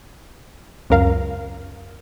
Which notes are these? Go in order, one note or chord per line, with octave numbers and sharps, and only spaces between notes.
C#2 F#2 A#4 F5